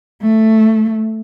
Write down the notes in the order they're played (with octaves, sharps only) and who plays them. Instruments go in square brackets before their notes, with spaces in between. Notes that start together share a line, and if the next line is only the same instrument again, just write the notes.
[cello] A3